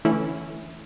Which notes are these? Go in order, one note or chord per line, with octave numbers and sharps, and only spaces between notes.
D3 E3 A3 C#4 E4